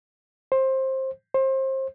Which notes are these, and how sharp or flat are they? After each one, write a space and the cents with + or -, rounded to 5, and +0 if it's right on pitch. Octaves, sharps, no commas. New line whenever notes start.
C5 +20
C5 +30